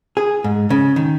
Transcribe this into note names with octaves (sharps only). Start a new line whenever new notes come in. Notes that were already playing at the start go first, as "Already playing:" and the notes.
G#4
G#2
C#3
D#3